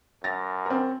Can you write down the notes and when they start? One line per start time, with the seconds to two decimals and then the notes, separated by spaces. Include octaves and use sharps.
0.24 F#2 A6 A#6
0.66 C4 A#4